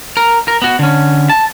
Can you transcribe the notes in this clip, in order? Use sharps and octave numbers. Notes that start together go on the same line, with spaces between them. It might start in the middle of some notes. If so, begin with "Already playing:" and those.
A#4
A#4
B3 F#4
D3 C#4
A5